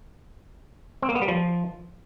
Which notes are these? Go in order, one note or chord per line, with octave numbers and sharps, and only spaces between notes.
C4
A#3
B3
G3
F3